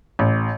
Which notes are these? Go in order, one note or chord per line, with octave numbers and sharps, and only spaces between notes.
A1